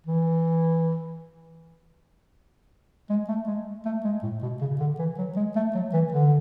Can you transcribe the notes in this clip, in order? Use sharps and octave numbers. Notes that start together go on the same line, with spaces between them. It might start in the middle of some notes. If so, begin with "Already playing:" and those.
E3
G#3
A3
G#3
A3
G#3
A2
B2
C#3
D3
E3
F#3
G#3
A3
F#3
E3
D3